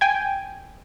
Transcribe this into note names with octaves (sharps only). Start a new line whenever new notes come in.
G5 G#5